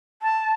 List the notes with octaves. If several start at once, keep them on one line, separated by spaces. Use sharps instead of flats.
A5